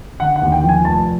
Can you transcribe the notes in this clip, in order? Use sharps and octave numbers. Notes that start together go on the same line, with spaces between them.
D3 F#5
F#5
D#2
G5
F3
G#5
F1 A5